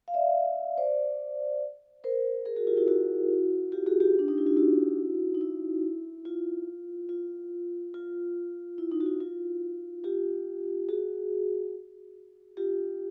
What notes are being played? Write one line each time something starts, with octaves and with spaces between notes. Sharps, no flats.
F5
D5 E5
C5 D5
A#4 C5
G#4 A#4
F#4 G#4
F4 G4
E4 F#4
E4 F#4
F4 G4
F#4 G#4
F4 G4
D4
D#4
E4
F4
E4 F#4
D#4
E4
F4
F4
F4
E4
D#4
F#4
F4
F4
F4 G4
F#4 G#4
F4 G4